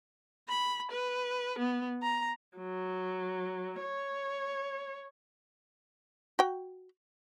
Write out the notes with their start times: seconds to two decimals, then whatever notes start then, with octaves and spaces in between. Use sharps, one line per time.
0.49 B5
0.92 B4
1.59 B3
2.03 A#5
2.58 F#3
3.81 C#5
6.39 F#4 G5